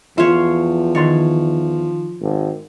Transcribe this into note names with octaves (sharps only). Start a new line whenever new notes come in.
E2 F3 F4 C#5 E5
D#3 C#5 D5 C6
G#1